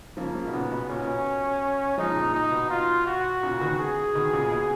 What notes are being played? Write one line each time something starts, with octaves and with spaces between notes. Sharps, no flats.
C#3 F3 A#3
C#3 F3
B2
A#2 C#3 B3
B2
A#2 C#4
C#3
B2
F3 G#3 D#4
A#2
A#2 D#4
B2
F4
F#4
A#2 C#3
B2 D#3
G#4
B2 D#3
A#2 C#3
B2